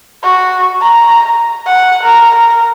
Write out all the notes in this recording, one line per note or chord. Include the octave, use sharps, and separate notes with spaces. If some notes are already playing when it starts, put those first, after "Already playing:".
F#4
A#5
F#5
A#4
A#4